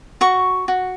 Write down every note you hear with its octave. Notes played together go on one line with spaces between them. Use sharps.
F#4 C#6
F#4